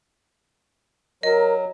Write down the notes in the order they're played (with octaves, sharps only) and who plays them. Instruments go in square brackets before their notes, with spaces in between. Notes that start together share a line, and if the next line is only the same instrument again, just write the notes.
[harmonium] F#3 [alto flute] A#4 [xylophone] D#5